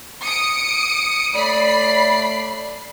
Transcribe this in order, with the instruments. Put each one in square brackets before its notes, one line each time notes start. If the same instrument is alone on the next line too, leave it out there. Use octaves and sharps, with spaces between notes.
[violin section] D#6 C#7 D7
[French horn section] A3 C#5 D5 [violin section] B5 C7